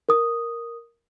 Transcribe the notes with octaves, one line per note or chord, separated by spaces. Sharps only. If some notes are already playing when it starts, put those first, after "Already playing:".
A#4 D#6